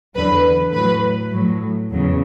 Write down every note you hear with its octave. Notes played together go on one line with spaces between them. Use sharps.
E2 D3 F#3 B4
A2 F#3 B4
A2 F#3
E2 C#3 F#3